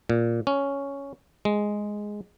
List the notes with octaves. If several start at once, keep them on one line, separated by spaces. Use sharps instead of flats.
A#2
C#4
G#3